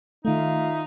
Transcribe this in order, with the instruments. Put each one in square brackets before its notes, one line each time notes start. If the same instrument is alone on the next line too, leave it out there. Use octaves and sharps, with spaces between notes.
[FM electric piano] D#3 A3 [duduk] D#4 [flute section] F4 E5 F5